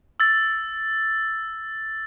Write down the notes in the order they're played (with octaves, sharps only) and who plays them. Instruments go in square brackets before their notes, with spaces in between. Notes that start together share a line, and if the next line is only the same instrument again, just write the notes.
[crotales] E6 A6